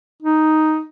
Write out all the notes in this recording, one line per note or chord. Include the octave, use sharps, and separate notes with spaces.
D#4